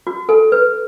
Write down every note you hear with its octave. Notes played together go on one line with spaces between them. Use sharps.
F#4
A4
B4